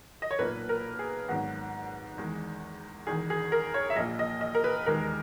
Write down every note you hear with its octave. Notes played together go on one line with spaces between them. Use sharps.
D#5
C#5
B1 A#2 A#3 B4
A#4
G#4
G#1 G#2 F#3 B3 F#4
E2 D#3 G#3
E1 E2 D#3 G#4
G#4
A#4
C#5
E5
A#1 A#2 A#3 D#5
D#5
D#5
A#4
B4
E1 D#2 D#3 G#3 A#4